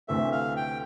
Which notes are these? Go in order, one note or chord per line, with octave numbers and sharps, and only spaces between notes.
D2 C3 E3 A3 E5
F5
G5